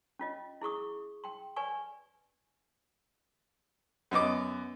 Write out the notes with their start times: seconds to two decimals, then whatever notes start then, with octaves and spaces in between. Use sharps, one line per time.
0.19 C#4 F4 D#5
0.62 E4 G#4 C#6 D#6
1.24 G5 C6
1.56 B4 D5 G#5 C#6
4.11 F#2 B3 D#5 D6